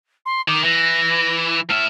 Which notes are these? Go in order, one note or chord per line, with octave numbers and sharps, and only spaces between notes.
C6
D#3 D6
E3 A#6
A2 E5 F6